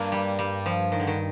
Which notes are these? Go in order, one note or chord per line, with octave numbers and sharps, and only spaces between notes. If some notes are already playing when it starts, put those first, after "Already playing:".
Already playing: G2 A#3
G3
G3
F3
D#3
D3
D#3